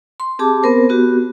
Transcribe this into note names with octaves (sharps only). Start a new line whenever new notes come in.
C6
C4 G4 G#4 A5 D6
B3 C4 A#4 C5
B3 F#4 G4